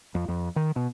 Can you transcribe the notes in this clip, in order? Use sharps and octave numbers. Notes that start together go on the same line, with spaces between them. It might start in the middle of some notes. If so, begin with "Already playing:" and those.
F2
F2
D#3
B2